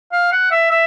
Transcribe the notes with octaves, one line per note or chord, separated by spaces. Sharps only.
F5
F#5
E5
E5